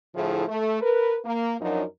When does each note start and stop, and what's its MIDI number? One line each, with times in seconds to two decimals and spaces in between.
0.14 0.45 45
0.14 0.45 50
0.14 0.45 53
0.14 0.45 57
0.14 0.45 64
0.14 0.45 68
0.47 0.77 57
0.81 1.17 70
0.81 1.17 71
1.24 1.54 58
1.60 1.82 42
1.60 1.82 53
1.60 1.82 54
1.60 1.82 62
1.60 1.82 63
1.60 1.82 70